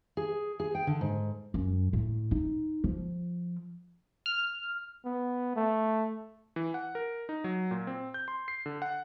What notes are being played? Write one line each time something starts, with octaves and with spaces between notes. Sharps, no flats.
G#4
G#4
G5
D3
G#2
F#2
A2
D#4
F3
F6
B3
A3
E3
F#5
A#4
D#4
F#3
A#2
C4
G6
C6
C7
D3
F#5